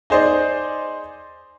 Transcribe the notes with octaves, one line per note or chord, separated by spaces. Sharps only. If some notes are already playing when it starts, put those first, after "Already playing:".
D#4 G#4 C5 D5 D#5